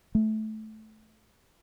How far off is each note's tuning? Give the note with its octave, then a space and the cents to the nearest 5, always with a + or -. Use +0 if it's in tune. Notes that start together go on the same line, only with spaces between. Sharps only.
A3 -15